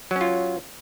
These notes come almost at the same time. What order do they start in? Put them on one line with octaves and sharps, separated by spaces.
F#3 C#4 F4